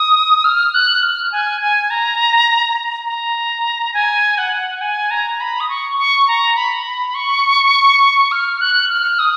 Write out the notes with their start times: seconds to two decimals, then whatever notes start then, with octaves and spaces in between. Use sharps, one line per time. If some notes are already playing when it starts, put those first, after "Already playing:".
Already playing: D#6
0.45 F6
0.74 F#6
1.03 F6
1.32 G#5
1.61 G#5
1.90 A#5
3.06 A#5
3.94 G#5
4.38 F#5
4.81 G#5
5.11 A#5
5.40 B5
5.60 D#6
5.69 C#6
5.98 C#6
6.28 A#5
6.57 B5
6.86 B5
7.15 C#6
8.32 F6
8.61 F#6
8.89 F6
9.19 D#6